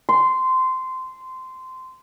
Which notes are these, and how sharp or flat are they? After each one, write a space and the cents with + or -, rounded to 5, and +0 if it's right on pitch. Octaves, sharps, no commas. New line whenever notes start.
C6 -15